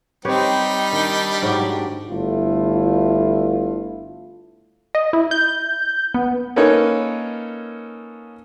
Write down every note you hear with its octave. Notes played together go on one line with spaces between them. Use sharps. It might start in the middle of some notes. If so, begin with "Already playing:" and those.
G3 C4 D#4 G4 B4 C#5
D#3 D4
G#2 F#3 G4
G1 A3 E4 F4
D#5
E4
G6
B3
A#3 C#4 D#4 A4 B4 C#5